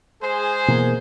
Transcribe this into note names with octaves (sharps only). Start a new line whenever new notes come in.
G#3 G#4 C5
B2 E3 A#3